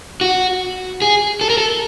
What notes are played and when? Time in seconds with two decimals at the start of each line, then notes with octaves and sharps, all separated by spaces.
0.21 F#4
1.02 G#4
1.41 A4
1.50 A#4
1.57 A4